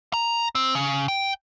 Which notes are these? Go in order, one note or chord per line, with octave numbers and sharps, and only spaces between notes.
A#5
C4
C#3
G5